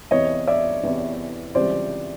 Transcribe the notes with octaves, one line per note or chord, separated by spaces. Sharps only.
E2 C3 E3 C#5 D#5
D5 E5
E2 C3 E3
C#2 C3 E3 G3 C5 D5